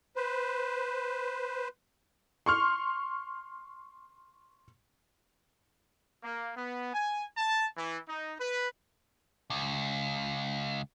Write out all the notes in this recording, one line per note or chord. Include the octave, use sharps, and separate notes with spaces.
B4 C5
C6 C#6 F6
A#3
B3
G#5
A5
E3
D#4
B4
C#2